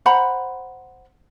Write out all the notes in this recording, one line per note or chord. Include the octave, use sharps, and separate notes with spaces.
C5 F#5 A#5 B5